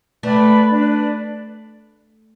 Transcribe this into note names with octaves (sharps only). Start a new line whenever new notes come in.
A3 B4 D5 G5 B5
D4 B4 D5